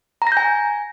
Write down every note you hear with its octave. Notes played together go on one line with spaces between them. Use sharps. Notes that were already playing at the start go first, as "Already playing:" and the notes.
A#5
A#6
G6
G#5